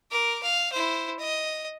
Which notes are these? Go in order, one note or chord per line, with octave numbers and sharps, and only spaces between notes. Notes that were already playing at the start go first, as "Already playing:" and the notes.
A#4 D6
F5
E4 C5
D#5